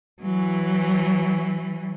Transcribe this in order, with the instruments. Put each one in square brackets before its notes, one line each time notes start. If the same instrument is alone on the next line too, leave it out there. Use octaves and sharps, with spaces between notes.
[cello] E3 F#3